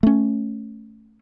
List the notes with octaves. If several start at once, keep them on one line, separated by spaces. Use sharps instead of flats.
A3 C#4